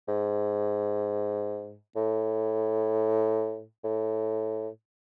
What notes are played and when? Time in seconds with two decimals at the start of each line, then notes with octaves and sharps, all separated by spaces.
0.08 G#2
1.96 A2
3.84 A2